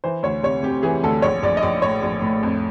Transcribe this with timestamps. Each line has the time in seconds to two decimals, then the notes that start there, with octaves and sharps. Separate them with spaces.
0.04 E3 C5
0.23 D2 C#5
0.43 C3 C#5
0.63 C3 G4
0.83 E3 G#4
1.03 D2 A4
1.22 A#1 C#5
1.43 A#1 D5
1.57 D#5
1.62 A#1 D5
1.82 A2 C#5
2.03 A#1
2.22 A2
2.43 F2